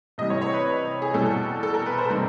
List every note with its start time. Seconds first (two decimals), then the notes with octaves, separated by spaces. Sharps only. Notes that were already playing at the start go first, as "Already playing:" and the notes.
0.18 C3 E3 G3 D#5
0.30 C#5
0.42 C#5
0.54 B4
1.02 G#4
1.14 E2 B2 G3 A4
1.63 A4
1.74 A#4
1.86 B4
1.98 C5
2.10 C3 D#3 G3 A#4